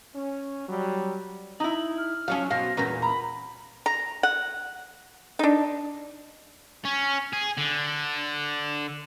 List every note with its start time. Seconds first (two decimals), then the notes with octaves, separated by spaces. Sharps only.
0.15 C#4
0.68 F#3 G3
1.60 D#4 E4 F#7
1.98 F6
2.28 F3 F#3 C#4 C#5 F5
2.51 B2 C5 F5 A#6
2.77 E2 A#2 C#4 A#4 B4
3.02 A#5 B5
3.86 A#5
4.23 F#5
5.39 D4 D#4
6.85 C#4
7.33 G#4
7.57 D3